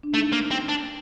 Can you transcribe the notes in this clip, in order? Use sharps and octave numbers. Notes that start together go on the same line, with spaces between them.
D4
A3 D#4
A#3
C4
D4